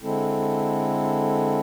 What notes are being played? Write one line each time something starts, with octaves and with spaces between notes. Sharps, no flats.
D3 G#3 C4 E4 A4